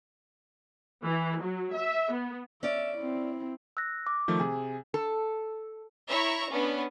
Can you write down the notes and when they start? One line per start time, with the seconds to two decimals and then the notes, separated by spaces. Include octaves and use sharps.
1.05 E3
1.42 F#3
1.77 E5
2.13 B3
2.63 C#4 D5 E5
2.98 C4 E4
3.77 E6 F#6 A#6
4.07 D6
4.28 D#3 F3 A3
4.40 C3 G#4 G#5
4.94 A4
6.09 E4 C#5 E5 A#5 C#6
6.50 B3 C#4 D4